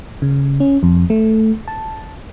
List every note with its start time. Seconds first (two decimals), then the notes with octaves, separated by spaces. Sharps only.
0.22 C#3
0.60 C#4
0.83 F2
1.10 A3
1.68 A5